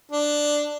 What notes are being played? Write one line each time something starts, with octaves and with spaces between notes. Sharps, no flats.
D4